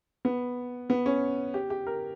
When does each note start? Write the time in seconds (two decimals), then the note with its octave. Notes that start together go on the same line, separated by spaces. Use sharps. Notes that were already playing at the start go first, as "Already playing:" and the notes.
0.25 B3
0.90 B3
1.06 C#4
1.54 G4
1.70 G4
1.87 A#4